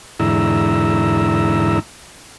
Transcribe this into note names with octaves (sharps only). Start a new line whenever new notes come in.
E2 G#2 D3 E4 A#5 E6